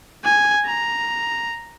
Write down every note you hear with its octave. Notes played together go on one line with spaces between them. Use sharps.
G#5
A#5